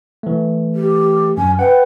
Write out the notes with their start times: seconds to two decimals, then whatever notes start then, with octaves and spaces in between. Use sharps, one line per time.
0.23 E3 A3
0.75 G4
1.37 F#2 G#5
1.59 B4 F#5 G5